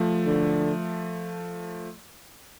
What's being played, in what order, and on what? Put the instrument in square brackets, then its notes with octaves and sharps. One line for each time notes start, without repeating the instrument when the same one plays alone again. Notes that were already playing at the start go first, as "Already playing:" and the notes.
Already playing: [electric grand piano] F3 A3
[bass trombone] D3